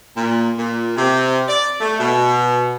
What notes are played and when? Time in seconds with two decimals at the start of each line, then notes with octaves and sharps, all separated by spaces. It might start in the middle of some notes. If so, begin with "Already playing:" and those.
0.15 A#2
0.56 A#2
0.97 C3
1.48 D5
1.80 A3
1.99 B2